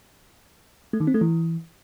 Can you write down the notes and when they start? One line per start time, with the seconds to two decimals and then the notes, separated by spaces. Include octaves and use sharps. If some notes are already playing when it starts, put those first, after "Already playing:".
0.93 A3
1.00 D#3
1.07 C4
1.14 A3
1.21 E3